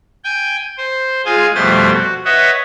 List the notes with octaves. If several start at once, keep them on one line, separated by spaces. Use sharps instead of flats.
G5 G#5
C5
G#3 F4 G#4 F5 G#5
F2 B2 G3 A3 C5 A6
F#4
B4 C#5 D#5 E5 F#5